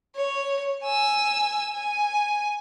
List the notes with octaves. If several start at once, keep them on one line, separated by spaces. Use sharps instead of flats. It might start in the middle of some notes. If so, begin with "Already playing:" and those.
C#5
G#5 E6
G#5